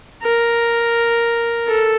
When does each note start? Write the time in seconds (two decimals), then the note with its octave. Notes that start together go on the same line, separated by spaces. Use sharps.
0.23 A#4
1.68 A4